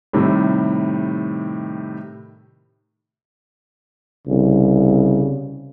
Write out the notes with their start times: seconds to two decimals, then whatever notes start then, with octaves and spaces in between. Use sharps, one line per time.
0.13 A2 C3 D#3 G3
4.27 C2 C#3